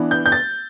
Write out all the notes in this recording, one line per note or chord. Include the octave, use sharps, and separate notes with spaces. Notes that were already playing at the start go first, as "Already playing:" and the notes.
Already playing: E3 B3 D4
G6
G6
A6